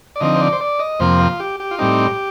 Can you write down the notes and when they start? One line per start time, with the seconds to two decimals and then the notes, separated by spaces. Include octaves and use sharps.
0.16 D5
0.20 D3 F3 C4 D#4 D#5
0.36 C5
0.41 D5
0.53 C5
0.61 D5
0.79 D#5
1.00 F2 C3 F3 A#3 C5
1.20 F4
1.40 G4
1.60 G4
1.71 F4
1.79 A2 G3 C4 D#4 G4